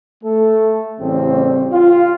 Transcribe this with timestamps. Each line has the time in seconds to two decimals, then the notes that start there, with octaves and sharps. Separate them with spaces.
0.23 A3 A4
1.00 A1 C#3 G3 C4
1.72 F4